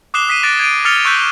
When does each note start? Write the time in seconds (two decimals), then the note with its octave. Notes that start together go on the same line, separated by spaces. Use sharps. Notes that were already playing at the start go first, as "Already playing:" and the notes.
0.14 D6 D#6 F#6 C7 E7 G7
0.29 D#6 B6 C7 D#7
0.43 D6 F#6 A6 A#6 D7 E7
0.59 G#6 D7 D#7
0.85 D#6 F6 A6 C#7 F7 G7
1.05 C#6 E6 F#6 G6 B6 D7